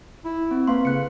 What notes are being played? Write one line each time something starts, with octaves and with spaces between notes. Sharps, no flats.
E4
C4
A#3 B4 F5 C6
C#3 A4 F#6 C#7